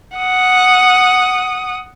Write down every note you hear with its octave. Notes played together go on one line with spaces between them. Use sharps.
F#5 D#6